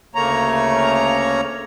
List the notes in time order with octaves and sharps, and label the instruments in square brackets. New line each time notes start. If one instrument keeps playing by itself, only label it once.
[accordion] D2 C#3 A3 A#3 C#5 A#5